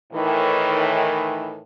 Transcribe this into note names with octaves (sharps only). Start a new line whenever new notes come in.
A2 D#3 E3